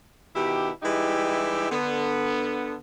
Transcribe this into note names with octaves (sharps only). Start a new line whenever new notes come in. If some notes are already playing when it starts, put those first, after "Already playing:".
B2 D#3 E4 G4
E3 G3 G#3 D#4 E4 G4
D3 B3